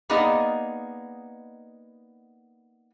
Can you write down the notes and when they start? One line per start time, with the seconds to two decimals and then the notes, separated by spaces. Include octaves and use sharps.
0.10 A#3 B3 D#4 G#4 D5 D#5